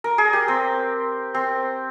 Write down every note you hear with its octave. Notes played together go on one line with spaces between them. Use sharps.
A#4
G#4
G4
C4
C4